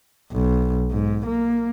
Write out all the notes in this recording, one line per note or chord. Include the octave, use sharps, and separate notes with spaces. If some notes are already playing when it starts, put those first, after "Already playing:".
B1
G#2
A#3